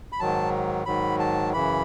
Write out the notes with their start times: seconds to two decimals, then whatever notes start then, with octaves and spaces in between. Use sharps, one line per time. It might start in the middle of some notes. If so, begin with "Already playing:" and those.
0.12 B5
0.20 G#2 D#3 F#3 A5
0.86 G#2 D#3 F#3 B5
1.20 A5
1.53 F#2 C#3 E3 B5